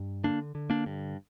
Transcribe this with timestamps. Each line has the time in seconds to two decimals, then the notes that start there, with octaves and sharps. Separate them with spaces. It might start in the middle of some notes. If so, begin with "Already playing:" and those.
Already playing: G2
0.24 D3 A#3 D4
0.55 D3
0.70 A#3 D4
0.86 G2